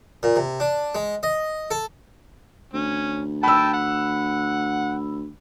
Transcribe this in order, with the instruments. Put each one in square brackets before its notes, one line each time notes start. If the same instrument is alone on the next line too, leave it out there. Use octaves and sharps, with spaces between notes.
[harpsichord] A#2
C3
D4
G#3
D#5
A4
[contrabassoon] D2 [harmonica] C#4
[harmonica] G5 A5 [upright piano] B5 E6
[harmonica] F#5